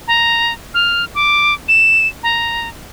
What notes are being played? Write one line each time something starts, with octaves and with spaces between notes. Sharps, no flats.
A#5
F6
D6
E7
A#5